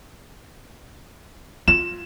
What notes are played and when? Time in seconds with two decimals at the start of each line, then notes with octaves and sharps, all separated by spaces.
1.68 F4 E7